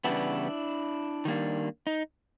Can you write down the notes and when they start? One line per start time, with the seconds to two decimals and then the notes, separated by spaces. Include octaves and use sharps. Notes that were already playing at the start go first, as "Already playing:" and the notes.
0.04 C#3 E3 G3 B3 D4 E4
1.25 D#3 G3 A#3 D4
1.87 D#4